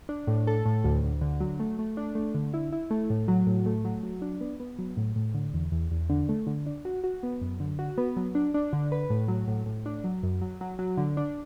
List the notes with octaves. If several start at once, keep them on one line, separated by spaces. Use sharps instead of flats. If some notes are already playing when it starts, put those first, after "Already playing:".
D4
A2
A4
A2
D2
D2
D3
F#3
A3
A3
D4
A3
D3
E4
E4
A3
A2
F#3
A2
A3
F#3
F#3
D4
B3
B3
F#3
A2
A2
D3
E2
E2
E2
D3
A3
D3
D4
F#4
F#4
B3
F#2
D3
F#4
B3
F#3
D4
D4
D3
B4
A2
F#3
A2
A2
D4
F#3
F#2
F#3
F#3
F#3
D3
D4